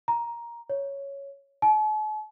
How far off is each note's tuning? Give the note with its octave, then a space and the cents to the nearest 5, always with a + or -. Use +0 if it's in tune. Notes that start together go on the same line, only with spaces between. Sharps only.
A#5 +10
C#5 +0
A5 -45